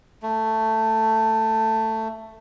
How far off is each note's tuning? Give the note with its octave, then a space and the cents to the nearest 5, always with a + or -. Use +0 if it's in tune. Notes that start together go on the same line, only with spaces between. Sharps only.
A3 +10